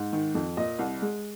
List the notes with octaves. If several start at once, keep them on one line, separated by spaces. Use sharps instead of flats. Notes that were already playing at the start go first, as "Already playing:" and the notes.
Already playing: G#2
D#3
F2
A#2 D#5
C2
G#3